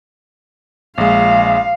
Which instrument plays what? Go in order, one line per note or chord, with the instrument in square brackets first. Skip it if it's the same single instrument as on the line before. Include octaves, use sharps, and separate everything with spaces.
[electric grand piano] A#1 G#3 [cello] F5